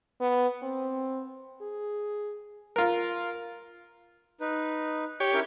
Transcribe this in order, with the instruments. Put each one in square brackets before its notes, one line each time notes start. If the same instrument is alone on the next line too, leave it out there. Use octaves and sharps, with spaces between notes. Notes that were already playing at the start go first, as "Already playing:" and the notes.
[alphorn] B3
C4
G#4
[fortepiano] F4 A#4
[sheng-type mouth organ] D#4 B4
[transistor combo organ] G4 C#5
[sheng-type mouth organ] C#4 E4 A#4